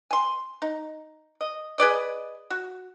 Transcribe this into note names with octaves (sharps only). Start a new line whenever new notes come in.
G#5 C6
D#4
D#5
G#4 B4 D5 D#5
F#4